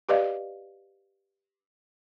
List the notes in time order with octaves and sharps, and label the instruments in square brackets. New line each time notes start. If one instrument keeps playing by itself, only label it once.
[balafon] G4 B4 D5 D#5 F5